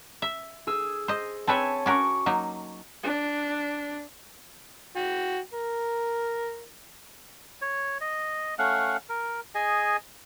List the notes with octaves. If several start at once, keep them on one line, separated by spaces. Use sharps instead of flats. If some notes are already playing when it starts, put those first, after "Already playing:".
E5
G#4 E6
C5 D#5
C4 B4 C#5 E5 G#5 A5
C#4 F#4 A#4 C#6 D6
F#3 A#3 D#4
D4
F#4 G5
A#4
C#5
D#5
A3 C#4 F5 F#5
A#4
G#4 D#5 G#5